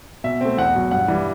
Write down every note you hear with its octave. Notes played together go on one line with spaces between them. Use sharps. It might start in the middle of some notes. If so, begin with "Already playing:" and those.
B2 E5
A3 C4
E2 F#5
B2 F#3
G2 F#5
E3 G3